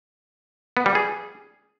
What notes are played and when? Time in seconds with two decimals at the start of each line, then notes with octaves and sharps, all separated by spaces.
0.77 B3
0.86 G3
0.95 G#4